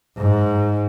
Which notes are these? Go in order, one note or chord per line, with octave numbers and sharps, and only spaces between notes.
G#2